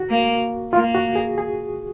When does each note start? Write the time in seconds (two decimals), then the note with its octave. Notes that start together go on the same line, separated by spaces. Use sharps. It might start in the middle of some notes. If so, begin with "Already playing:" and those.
Already playing: F#4
0.10 A#3
0.73 A#3 F4
0.95 F#4
1.16 G#4
1.38 G#4